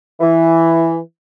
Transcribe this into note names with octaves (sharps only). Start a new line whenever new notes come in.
E3